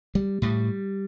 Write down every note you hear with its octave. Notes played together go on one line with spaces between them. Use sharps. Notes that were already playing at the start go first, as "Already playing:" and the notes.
G3
A2 G3